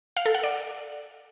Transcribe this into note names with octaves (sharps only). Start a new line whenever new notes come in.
F5
A4
F#5
D5